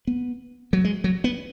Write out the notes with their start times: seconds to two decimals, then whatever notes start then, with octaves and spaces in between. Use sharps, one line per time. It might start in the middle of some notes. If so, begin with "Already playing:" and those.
0.07 B3
0.73 F#3
0.85 G#3
1.04 F#3
1.24 B3